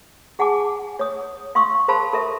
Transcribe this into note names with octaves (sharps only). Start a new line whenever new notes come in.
G#4 F#5 G#5 A5 D6
C#5 D#6
F5 C6 C#6 D#6 E6
A#4 C5 F5 A5 B5 C6
A4 A#4 E5